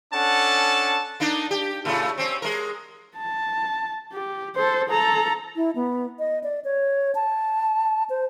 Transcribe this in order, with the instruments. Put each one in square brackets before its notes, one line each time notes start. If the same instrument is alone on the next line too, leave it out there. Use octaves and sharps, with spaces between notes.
[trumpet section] C#4 D4 A4 F#5 A5
[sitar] A#3 D4 D#4
G4
A2 C#3 A3
C4 C#4
G#3 A#4
[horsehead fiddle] A5
G4
A4 C5
A4 A#5
[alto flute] E4
B3
D#5
D5
C#5
A5
C5